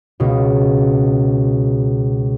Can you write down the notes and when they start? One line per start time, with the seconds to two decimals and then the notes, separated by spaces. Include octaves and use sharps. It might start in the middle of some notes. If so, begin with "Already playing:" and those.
0.20 C#2 B2